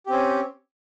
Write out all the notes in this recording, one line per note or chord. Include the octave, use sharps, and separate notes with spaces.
C4 C#4 G4